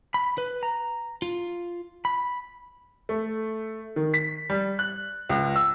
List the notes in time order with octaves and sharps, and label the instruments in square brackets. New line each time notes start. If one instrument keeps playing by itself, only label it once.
[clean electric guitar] B5
B4
A#5
F4
B5
[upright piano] A3
D#3
B6
G3
F#6
C#2
E6